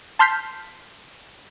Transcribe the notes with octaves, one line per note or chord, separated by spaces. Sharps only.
A5 C6 F6 G6 B6 C7